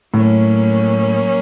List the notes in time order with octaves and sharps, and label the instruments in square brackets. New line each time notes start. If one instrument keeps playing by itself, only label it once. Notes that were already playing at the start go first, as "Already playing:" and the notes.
[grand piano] A2 [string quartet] F#3 A#3 C#4